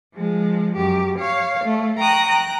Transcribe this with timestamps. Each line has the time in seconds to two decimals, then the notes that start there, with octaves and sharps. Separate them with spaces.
0.15 F3 G#3
0.75 F#2 G4
1.19 C#5 F5
1.64 A3
1.97 G5 A#5 C#6 D#6 F#6
2.26 G5 A#5 F#6